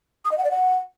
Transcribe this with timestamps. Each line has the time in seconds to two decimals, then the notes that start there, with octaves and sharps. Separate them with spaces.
0.25 D#6
0.31 D#5
0.38 F#5
0.44 D5
0.51 F#5